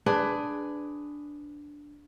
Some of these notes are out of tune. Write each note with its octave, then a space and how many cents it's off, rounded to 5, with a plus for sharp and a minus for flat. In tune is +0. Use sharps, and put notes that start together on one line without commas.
D4 +0 G#4 +0 B4 +20